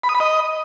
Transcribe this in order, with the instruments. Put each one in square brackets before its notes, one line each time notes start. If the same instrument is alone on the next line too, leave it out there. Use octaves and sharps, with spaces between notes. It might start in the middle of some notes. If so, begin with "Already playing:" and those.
[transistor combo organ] B5
D#6
B5
D#5